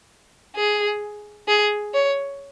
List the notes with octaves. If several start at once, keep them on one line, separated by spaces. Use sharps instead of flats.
G#4
G#4
C#5